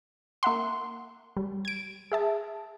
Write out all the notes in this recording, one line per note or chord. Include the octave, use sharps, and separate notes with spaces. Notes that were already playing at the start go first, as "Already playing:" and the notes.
A#3 E5 F#5 C6
G3
G#6 D7
G#4 E5 A5